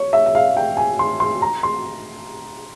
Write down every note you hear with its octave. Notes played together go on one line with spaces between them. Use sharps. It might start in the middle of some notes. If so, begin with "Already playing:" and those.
Already playing: C#5
E5
E5
F5
G5
G#5
C6
C6
A#5
C6